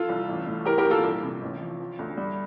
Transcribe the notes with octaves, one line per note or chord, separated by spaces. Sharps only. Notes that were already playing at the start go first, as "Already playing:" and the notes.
Already playing: F3 F4 A4
C2
A1
A2
E3 G4 A#4
G4 A#4
A#1
F4 A4
C2
C3
A1
F3
F3
D2
G3